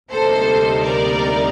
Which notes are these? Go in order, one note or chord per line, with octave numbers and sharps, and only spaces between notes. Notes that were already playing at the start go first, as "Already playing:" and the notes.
D2 C3 G3 A#3 D#4 A4 C5
A#4 D5